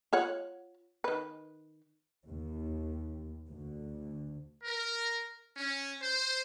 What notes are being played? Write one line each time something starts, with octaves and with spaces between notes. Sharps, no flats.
F4 C#5 F#5
D#3 B4
D#2
D2
A#4
C#4
C5